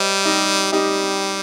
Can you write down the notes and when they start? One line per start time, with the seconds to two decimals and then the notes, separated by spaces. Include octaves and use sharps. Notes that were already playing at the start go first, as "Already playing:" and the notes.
Already playing: G3 C5 D#5
0.25 D#4 G4
0.72 G3 D#4 G4